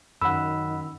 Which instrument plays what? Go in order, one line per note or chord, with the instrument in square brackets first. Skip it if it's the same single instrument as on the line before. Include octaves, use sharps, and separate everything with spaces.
[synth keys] F#2 [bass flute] D#3 [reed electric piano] F#5 E6 [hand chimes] B5